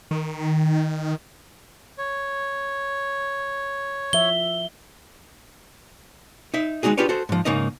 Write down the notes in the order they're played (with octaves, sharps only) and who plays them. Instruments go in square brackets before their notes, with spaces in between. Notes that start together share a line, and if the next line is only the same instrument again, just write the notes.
[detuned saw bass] D#3
[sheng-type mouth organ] C#5
[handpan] F3 E5 [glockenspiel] G7
[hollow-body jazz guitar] D#4 E5
G#3 A#3 D#4 F#4 G#4
D4 F4 G4 G#4 B4 C#5
F#4 A4 C5
G#2 F3
G#2 C#3 A#3 D#4 D#5